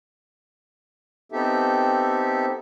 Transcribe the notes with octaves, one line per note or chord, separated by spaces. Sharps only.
B3 C4 D#4 G4 A4 E5